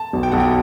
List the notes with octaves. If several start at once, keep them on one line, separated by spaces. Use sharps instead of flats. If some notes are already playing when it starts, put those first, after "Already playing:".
Already playing: A5
B1
G5
B1 F#5
G5